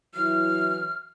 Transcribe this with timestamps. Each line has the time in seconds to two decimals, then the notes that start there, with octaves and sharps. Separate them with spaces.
0.15 E3 F#3 E4 F6